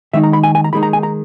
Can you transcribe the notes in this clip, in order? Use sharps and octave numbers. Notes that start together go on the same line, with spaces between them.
D#3 G#3 D#4 E5
A#5
B5
G#5
G#5
A#5
D#3 G#3 D#4 B5
A#5
G#5
A#5